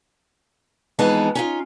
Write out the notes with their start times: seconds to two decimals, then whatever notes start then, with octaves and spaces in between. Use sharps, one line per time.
0.99 F2 E3 G#3 B3 D#4 A5
1.35 C#4 D#4 F4